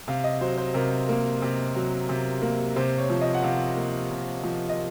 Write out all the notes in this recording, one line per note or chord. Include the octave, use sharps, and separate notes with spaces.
C3 F5
D#5
F#3 C5
C5
C3 A#4
A#3
C3
F#3
C3
A#3
C3 C5
C#5
F3
D#5
F#5
C3 F5
A#3
C3
F3
D#5